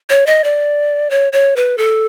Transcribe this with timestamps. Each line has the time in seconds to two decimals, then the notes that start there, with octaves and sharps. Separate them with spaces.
0.10 C#5
0.26 D#5
0.44 D5
1.10 C#5
1.33 C#5
1.56 B4
1.78 A4